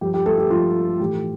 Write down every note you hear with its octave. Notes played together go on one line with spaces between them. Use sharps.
G2 F3 G4
G4
A3 A4
G4
G2 F3 F4
A2 E3 G4